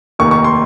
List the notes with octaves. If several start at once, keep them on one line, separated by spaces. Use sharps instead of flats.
F1 D#2 D#3 A#3 C#6
C#6
C6